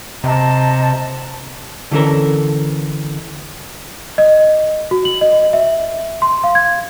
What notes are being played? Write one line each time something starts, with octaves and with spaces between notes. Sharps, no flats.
C3 D#5 A5 A#5
D3 E3 C#4 A4 A#4
D#5
F#4
F#7
D#5
E5
C6
F5
G#6